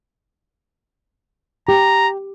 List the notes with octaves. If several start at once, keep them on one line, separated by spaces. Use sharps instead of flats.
G4 A#5